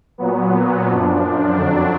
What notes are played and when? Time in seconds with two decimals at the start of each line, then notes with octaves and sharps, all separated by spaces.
0.18 A#2 F#3 B3
0.87 F#2 F3 D4
1.56 F2 D3 F#3 D4